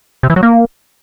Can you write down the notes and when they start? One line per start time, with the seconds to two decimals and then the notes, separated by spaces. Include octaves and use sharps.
0.23 C3
0.30 E3
0.36 F#3
0.43 A#3